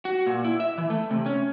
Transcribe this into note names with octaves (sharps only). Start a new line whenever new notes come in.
F#4
A#2
E4
E5
E3
A3
C3
C#4